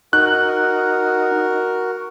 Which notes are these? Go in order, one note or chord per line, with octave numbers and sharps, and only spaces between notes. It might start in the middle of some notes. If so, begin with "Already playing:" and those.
D#4 F#4 A#4 F#6